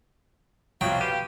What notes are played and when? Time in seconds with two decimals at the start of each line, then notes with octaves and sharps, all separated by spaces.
0.81 C2 F2 B2 F#3 F4 F#4 F5 G5
1.01 G4 B4 D#7